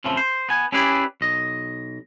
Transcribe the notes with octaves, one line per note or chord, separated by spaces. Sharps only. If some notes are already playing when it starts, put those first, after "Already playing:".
F2 A2 C#3 E3 F3
C5
B3 G#5
C#4 E4 G4 G#4 B4 D5
B1 D#5